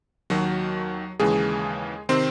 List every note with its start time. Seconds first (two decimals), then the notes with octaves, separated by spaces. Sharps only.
0.30 D#2 D#3 F#3 F#4
1.19 D#2 C#3 E3 G#3 G#4
2.09 C3 D#3 C4 C5